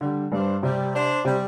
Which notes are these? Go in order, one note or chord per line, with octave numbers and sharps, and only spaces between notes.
D3 G3
G2 G3 D4 C5
C3 G3 C4
D4 C5
C3 G3 C4